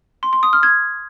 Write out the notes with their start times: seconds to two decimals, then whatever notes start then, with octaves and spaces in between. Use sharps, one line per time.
0.23 C6
0.33 C6
0.43 D#6
0.53 F6
0.63 G#6